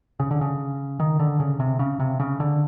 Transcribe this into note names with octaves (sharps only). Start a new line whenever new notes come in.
C#3
D3
C#3
D#3
D3
C#3
C3
C#3
C3
C#3
D3